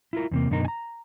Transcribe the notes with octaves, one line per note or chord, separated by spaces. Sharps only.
E4 F4 A#4
E2 C3 A#3
F#2 B2 D3 D#4 A#4
G#5 A#5